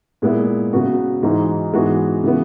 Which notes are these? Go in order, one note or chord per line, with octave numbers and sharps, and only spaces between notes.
A#2 G#3 B3 E4
C#3 F#3 B3 F#4
G#2 E3 G#3 D#4 F#4
G#2 E3 G#3 B3 F#4
C#3 E3 B3